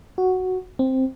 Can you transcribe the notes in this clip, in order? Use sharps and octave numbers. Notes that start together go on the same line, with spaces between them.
F#4
C4